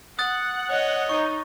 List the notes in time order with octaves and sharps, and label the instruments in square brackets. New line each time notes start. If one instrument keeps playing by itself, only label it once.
[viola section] F#5 [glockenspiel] D#6 F#6 A6
[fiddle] C#5 D#5
[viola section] D#4 [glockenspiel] C#6